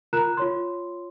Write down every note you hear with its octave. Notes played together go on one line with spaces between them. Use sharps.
F4 A#4 A#5 F#6 E7
F4 C#5 C6